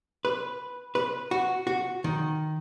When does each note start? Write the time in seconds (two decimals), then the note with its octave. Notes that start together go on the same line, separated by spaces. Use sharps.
0.25 B4
0.95 B4
1.31 F#4
1.67 F#4
2.04 D#3